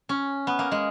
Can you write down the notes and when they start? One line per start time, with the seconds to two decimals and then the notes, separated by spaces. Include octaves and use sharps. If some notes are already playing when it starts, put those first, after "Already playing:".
0.09 C#4
0.47 B3
0.59 A#3
0.71 G#3